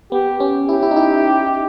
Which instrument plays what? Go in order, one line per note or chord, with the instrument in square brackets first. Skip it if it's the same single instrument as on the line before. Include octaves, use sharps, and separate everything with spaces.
[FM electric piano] B3 [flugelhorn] G4
[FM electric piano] C#4
[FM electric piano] E4 [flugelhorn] G4
[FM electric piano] E4
D#4
E4